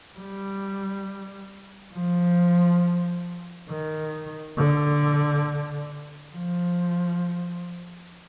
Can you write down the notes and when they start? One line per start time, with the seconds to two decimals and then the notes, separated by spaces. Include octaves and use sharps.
0.17 G3
1.94 F3
3.69 D#3
4.57 D3
6.33 F3